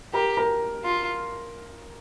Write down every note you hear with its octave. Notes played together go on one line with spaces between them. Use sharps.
G4 A#4 A#5
A#4 A#5
F4